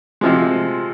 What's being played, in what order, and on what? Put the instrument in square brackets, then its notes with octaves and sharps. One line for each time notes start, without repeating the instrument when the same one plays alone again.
[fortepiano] C3 F3 G#3